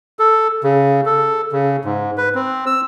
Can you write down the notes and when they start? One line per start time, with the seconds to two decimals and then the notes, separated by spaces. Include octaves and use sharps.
0.19 A4
0.64 C#3
1.06 A4
1.52 C#3
1.85 G#2
2.18 B4
2.35 C4
2.66 E6